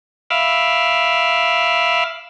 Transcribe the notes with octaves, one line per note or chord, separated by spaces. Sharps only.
E5 F5 B5 D6 E6 F6